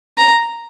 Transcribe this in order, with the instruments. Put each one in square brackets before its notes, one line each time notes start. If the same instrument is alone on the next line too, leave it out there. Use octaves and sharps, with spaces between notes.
[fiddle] A#5